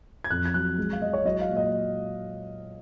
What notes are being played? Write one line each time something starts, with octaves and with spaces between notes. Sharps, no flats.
G#6
F2 F#6
G#6
F#3 F#6
G#3
F5
G#3 D#5
C#5
F#3 D#5
F5
A#2
D#5